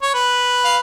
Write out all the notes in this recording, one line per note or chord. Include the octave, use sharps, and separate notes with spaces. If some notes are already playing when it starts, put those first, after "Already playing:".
C#5
B4
F5